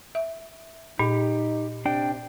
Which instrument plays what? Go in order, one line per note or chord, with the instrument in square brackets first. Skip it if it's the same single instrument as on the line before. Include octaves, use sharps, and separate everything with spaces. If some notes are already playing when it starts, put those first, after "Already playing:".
[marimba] E5
[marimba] A#2 [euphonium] D#4 [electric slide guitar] G4
[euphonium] C3 [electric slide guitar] D4 D5 G5